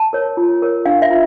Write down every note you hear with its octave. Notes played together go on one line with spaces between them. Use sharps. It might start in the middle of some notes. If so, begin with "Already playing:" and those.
Already playing: A5
A#4 C#5
F4
A#4 C#5
D4 F5
E5
F4